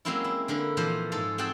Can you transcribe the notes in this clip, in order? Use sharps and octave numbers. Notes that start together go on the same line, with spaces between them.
F#3 G#3 A#3 C4 C#4 E4
E4
D3 A#3 A#4 B4
A#2 E3 F3 F4 C5 F#5
G#2 G#3 F4 A4
C4 F#4 G#4 F#5 G5 A5